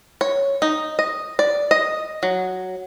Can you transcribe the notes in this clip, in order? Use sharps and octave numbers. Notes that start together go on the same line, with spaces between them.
C#5
D#4
D#5
D5
D#5
F#3